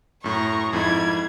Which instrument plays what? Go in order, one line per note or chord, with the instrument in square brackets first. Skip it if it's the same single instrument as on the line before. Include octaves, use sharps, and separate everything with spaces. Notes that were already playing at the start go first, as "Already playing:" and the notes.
[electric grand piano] F#2 A2 [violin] A#5 C#6
[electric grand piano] F2 G#2 E4 [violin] G#6